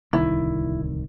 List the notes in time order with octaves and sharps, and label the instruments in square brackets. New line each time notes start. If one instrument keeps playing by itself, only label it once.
[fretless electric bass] D1 C2 D#3 [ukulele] E4